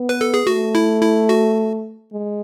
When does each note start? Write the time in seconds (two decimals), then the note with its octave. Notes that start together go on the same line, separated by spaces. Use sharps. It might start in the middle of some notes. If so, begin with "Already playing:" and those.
Already playing: B3
0.09 B4
0.21 A4
0.34 G#4
0.46 A3 F#4
0.75 E4
1.02 E4
1.29 F#4
2.13 G#3